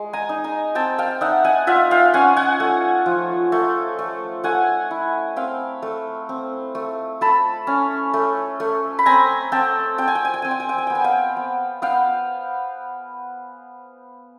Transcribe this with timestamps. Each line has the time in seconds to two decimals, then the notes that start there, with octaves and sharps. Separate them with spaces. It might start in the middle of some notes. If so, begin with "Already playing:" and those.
Already playing: G#3
0.13 G#5 A#5
0.29 D#4
0.44 G#5 A#5
0.75 C4 G5 A5
0.98 F5 G5
1.21 D#4 E5 F#5
1.44 F#5 G#5
1.67 F4 E5 F#5
1.91 F5 G5
2.14 C#4 F#5 G#5
2.37 F#5 G#5
2.60 A3
3.06 F3
3.52 A3
3.99 A3
4.44 A3 F#5 G#5
4.91 E4
5.36 C4 F5 G5
5.82 A3
6.29 C4
6.75 A3
7.21 A3 A5 B5
7.67 C#4
8.14 A3
8.60 A3
8.99 B5
9.06 C4 G#5 A#5
9.52 C4 G5 A5
9.98 C4 G5
10.08 G#5
10.15 G5
10.25 G#5
10.34 G5
10.42 C4 G#5
10.51 G5
10.60 G#5
10.69 G5
10.78 G#5
10.87 B3 G5
10.95 G#5
11.04 F5 G5
11.37 B3
11.82 B3 F5 G5